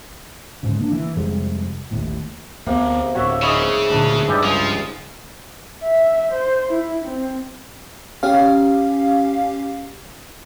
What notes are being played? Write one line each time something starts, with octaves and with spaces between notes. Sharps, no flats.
D#1 G#2 C#3
A#3 D4
E3
F2 C3 G3 G#3
A1 D#2 A2
D2 C3 A#3 B3
D1 F#4 C#5 E5
G#2 C#3 G#4 C#5 D#5 B5
D2 A#2 D4
G2 E3 G4 D5 D#5
C#2 F3 D#5
E5
C5
E4
C4
C#4 G4 F5